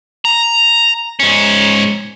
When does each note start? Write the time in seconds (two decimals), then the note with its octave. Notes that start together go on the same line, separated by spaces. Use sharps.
0.25 A#5
1.20 G#2 C#4